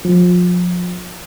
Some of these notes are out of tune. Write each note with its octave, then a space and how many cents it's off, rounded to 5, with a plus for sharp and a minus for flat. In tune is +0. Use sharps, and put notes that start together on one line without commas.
F3 +30